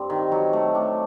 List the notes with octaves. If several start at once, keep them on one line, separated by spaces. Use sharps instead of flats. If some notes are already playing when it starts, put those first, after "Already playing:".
Already playing: G2 G3 C4
D#3
F#3
A3
D4